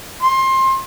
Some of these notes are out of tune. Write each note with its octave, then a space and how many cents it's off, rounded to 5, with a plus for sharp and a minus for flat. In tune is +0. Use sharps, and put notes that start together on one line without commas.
C6 +25